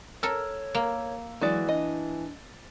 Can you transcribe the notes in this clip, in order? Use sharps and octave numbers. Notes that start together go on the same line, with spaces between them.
A4 A#4 C#5 E6
A#3
E3 F#3 G#3 F#4 D5 A6
D4 D#5